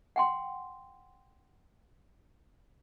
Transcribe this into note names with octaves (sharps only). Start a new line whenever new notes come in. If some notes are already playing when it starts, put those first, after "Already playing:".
F#5 G5 C6